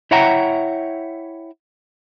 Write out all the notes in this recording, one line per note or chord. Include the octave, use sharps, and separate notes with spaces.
E4 C#5 E5 F#5 G5 A#5